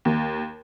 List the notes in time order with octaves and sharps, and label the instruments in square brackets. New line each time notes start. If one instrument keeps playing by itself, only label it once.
[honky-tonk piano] D#2